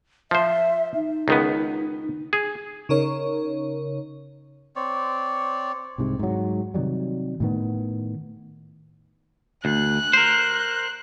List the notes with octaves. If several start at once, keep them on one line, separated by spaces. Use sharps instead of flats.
F3 C5 E5
D#4
C#2 D#3 B3
G#4
C#3 D#4 A#4 C#5
C4 C#5 D5
C2 G#2 C3 G#3
G#2 F#3
C3 D#3 F#3 G3
A2 D#3 B3
D2 F#6
A#4 C5